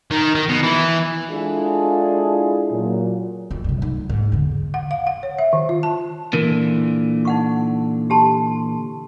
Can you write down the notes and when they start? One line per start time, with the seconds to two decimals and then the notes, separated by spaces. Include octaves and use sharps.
0.11 D#3
0.35 D#3
0.49 B2
0.63 E3
1.30 G#3 D4 E4 F4 G#4 A4
2.71 A#2 F#3
3.51 F2
3.64 G2 C3
3.82 D#4
4.09 G#2
4.32 E2 D3
4.74 F#5
4.91 F5
5.07 F#5
5.23 C#5
5.39 E5
5.53 D#3
5.69 F4
5.83 A5
6.33 A#2 D3 E3 A#4
7.25 D#4 F#5 C#6
8.10 G4 A5 C6